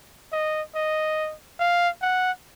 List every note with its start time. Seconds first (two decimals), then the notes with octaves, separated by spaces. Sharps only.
0.32 D#5
0.75 D#5
1.59 F5
2.02 F#5